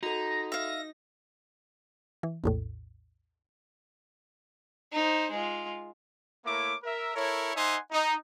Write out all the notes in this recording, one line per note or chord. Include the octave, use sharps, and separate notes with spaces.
D#4 F#4 A4 A#5
E5 F5 A#6
E3
A#1 E2 A2
D#4 C5
G#3 F4
A3 A#3 E4 A#4 C#5 D6
A#4 E5
E4 A4 A#4 C#5
D#4 C5 E5 F#5 G#5 C6
D#4